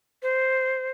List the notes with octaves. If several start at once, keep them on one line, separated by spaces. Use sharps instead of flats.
C5